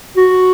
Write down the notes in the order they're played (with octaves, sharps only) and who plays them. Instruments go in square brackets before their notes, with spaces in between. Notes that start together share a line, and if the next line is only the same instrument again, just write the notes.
[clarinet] F#4